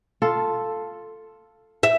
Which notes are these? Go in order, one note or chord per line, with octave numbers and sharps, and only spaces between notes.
F4 A4
E5